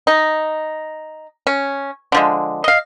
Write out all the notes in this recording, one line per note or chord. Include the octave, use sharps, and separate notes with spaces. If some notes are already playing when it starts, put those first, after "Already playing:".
D#4
C#4
D3 F3 G#3
D#5 F5